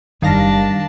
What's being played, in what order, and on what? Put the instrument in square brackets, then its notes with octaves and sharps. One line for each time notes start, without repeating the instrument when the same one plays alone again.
[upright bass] F#1 E2 [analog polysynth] D#3 F5 A#6 [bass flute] G3 [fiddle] D4 A5